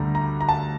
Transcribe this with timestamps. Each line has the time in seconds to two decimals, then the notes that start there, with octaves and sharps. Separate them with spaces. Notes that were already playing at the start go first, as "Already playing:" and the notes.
Already playing: D2 D3 G3 A#5
0.15 A#5
0.41 A#5
0.49 A5